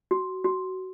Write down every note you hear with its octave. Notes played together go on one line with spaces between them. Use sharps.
F#4
F#4